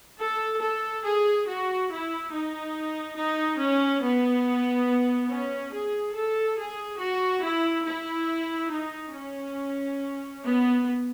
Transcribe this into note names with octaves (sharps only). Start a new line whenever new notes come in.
A4
A4
G#4
F#4
E4
D#4
D#4
C#4
B3
C#4
G#4
A4
G#4
F#4
E4
E4
D#4
C#4
B3